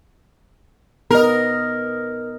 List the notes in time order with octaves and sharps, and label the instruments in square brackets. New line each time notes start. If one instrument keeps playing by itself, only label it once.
[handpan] B3 D#5 [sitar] A#4